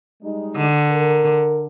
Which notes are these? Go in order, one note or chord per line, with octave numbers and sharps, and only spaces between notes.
G3 G#3 D#4
D3
A#4